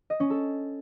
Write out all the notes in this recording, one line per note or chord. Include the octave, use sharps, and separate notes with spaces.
D#5
C#4
A4